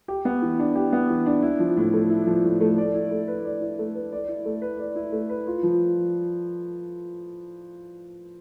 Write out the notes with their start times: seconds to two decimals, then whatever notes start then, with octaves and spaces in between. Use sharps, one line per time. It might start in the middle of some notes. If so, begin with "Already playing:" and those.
0.08 G4
0.25 B3
0.42 E3
0.59 D4
0.75 G4
0.93 B3
1.10 E3
1.26 D4
1.42 E4
1.59 F3
1.77 A2
1.93 A3
2.10 E4
2.27 F3
2.44 A2
2.61 A3
2.78 D5
2.94 E4
3.11 A3
3.28 B4
3.45 D5
3.61 E4
3.79 A3
3.95 B4
4.12 D5
4.28 E4
4.46 A3
4.62 B4
4.79 D5
4.96 E4
5.12 A3
5.29 B4
5.47 F4
5.63 F3